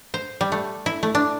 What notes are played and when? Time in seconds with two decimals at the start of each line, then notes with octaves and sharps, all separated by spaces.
0.14 C5
0.41 G3
0.52 A3
0.86 E4
1.03 A3
1.15 D4